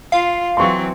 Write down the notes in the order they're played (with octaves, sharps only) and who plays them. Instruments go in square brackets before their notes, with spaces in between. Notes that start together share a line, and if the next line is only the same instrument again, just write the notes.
[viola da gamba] F4 [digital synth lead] F5
[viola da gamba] E3 F#3 C4 [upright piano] C6 C#6